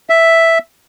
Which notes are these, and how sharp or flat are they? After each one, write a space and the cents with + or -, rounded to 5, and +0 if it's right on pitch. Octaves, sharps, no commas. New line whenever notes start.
E5 +0